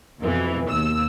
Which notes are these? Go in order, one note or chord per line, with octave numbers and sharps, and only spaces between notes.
F2 B2 E3
D#2 E6